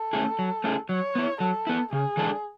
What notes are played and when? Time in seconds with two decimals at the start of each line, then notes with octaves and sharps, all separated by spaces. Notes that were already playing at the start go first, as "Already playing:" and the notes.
Already playing: A4
0.13 A3 C#4 E4 G#4
0.39 F#3
0.64 A3 C#4 E4 G#4
0.89 F#3 C#5
1.15 B3 E4
1.40 F#3 A4
1.67 B3 E4
1.92 C#3 G#4
2.17 E3 G#3 D4 A4